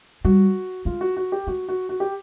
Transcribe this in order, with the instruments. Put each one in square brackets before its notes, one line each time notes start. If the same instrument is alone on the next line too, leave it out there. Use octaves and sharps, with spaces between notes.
[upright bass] G3 [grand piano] F#4
[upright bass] G#3 [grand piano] F4
[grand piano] F#4
F#4
G4
[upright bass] G#3 [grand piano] F#4
[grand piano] F#4
F#4
G4